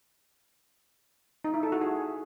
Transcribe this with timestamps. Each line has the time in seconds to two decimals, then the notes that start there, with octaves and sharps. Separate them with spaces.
1.44 D#4
1.54 E4
1.63 A4
1.72 F#4
1.81 G#4